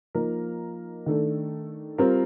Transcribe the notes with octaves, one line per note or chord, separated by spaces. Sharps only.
F3 A#3 D#4 A#4
D#3 A3 D4 A4
G3 C4 F4 A#4